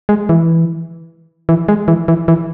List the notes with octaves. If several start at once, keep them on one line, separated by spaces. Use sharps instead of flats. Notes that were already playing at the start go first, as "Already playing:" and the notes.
G#3
E3
E3
G#3
E3
E3
E3